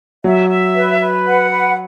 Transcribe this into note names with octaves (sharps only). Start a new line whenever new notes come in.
F#3 E5
E5
B4
B4
F#5
B4